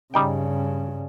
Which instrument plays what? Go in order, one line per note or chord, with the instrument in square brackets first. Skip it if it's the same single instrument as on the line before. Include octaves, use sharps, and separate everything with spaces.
[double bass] G2 C#3 [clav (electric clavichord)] G3 D#4 G5